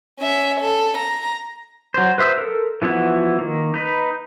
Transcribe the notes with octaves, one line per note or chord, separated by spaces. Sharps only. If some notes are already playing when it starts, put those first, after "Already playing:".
C#4 E5
A4
A#5
F#3 C5
B4 C5 E5 D#6 E6
A4 A#4
E3 F3 B3 E4 F#4
D#3 A#3
D#4 B4